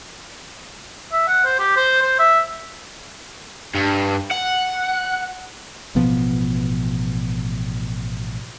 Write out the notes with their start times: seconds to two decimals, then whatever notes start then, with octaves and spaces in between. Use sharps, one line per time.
1.12 E5
1.28 F#5
1.45 C5
1.59 G4
1.77 C5
2.02 C5
2.19 E5
3.75 G2
4.31 F#5
5.95 A1 B2 F3 B3